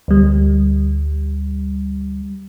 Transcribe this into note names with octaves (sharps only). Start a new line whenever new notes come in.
D2 G3